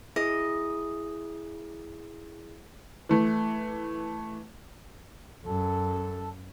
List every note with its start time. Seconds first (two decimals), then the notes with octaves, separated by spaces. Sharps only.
0.16 E4 G#4 D#5
3.09 E3 A3
5.45 F#2 A4